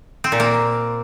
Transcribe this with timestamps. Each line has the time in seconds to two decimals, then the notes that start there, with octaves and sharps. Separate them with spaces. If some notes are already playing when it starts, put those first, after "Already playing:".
0.24 C4
0.32 A#2
0.40 A#3